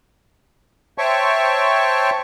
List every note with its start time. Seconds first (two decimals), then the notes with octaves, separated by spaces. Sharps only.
0.98 C5 C#5 E5 G5 A5 C#6